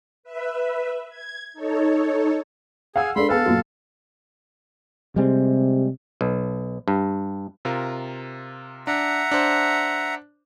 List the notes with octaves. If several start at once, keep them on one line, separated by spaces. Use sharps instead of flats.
B4 E5
G#6
D#4 A4 C#5
G#4 F5 F#5 E6
G#3 D4 A4 B5 C6
B3 G#4 A4 B4 F5
F#2 A#2
C3 G3 G#3 C4
B1
G2
C3 F4 A#4
D4 E5 F#5 A#5
D4 C5